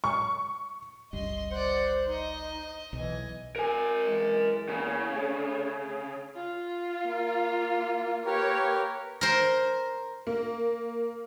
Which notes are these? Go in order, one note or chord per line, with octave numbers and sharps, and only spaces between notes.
C#6
G1 C#2 G2 D#5 C6
C5 D5 F#5
D#4 C5 D#5
B1 E3 D#5 G#5
A#4 G#5
F#2 E3 G#3
E2 C#3 A#3
A3 G#4
F4
A#3
G4 A#4 B4 C#5
A#4 C5
A#3